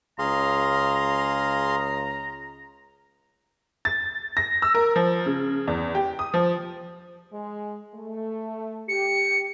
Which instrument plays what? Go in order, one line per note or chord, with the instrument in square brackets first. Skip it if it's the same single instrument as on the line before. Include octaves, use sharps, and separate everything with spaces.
[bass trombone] C#2 [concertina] G#4 F5 C6 [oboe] A#5
[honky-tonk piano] A6
A#6
E6
A#4
F3
C#3
E2
G4
D#6
F3
[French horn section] G#3
A3
[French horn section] G4 [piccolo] C#7